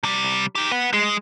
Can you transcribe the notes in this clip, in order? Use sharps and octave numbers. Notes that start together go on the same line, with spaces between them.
C3 G3
D#4 G4
B4 F#5
G#3 G#4